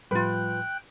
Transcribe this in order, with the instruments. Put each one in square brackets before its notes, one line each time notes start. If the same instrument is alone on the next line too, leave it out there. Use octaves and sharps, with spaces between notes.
[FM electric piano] A2 F3 G3 [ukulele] F4 B4 [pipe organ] G5 F#6